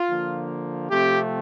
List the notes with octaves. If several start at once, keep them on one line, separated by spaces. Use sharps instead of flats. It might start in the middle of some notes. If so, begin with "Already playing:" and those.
Already playing: F4
D3 F3 A#3
C3 F3 A3 C4 G4